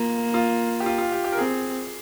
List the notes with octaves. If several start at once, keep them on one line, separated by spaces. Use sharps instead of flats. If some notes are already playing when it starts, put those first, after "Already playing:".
Already playing: A#3 F4
F4
G4
F4
F4
G4
G4
A#4
C4 G#4